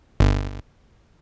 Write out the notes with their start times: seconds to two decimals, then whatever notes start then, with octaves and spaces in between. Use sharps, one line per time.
0.20 G1